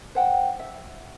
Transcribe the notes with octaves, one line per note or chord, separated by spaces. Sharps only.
C5 F#5 G5
E5